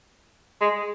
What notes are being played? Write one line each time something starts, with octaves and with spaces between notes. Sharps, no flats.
G#3